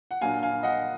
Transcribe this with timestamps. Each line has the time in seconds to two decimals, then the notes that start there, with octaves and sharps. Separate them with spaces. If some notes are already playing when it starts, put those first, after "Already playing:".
0.11 F#5
0.21 A#2 F#3 D4 F5 G#5
0.43 F5 G#5
0.63 D#5 F#5